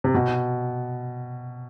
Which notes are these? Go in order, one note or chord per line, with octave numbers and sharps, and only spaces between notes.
C3
B2